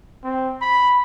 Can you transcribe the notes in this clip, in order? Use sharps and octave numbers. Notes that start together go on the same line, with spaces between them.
C4
B5